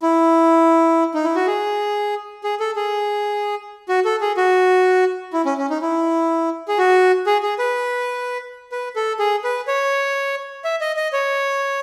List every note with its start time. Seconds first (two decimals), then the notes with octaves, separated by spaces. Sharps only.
0.02 E4
1.14 D#4
1.25 E4
1.35 F#4
1.47 G#4
2.44 G#4
2.60 A4
2.76 G#4
3.89 F#4
4.05 A4
4.21 G#4
4.37 F#4
5.33 E4
5.45 C#4
5.58 C#4
5.70 D#4
5.82 E4
6.68 G#4
6.78 F#4
7.26 G#4
7.43 G#4
7.59 B4
8.72 B4
8.96 A4
9.19 G#4
9.44 B4
9.68 C#5
10.64 E5
10.81 D#5
10.97 D#5
11.13 C#5